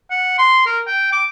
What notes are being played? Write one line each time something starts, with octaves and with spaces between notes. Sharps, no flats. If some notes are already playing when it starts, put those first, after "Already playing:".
F#5
C6
A#4
G5
D6